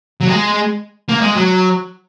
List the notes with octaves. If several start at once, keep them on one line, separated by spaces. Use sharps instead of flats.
F#3
G#3
A#3
G#3
F#3